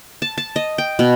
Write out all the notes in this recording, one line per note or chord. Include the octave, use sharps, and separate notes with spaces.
A5
A5
D#5
G5
B2